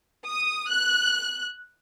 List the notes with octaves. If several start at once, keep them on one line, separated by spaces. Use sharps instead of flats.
D#6
F#6